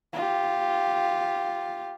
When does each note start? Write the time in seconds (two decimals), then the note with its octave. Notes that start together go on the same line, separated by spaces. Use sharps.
0.13 F4 G4